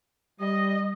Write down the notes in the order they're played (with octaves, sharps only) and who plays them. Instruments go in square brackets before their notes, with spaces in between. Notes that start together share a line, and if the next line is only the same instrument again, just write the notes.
[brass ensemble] G3 [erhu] D#5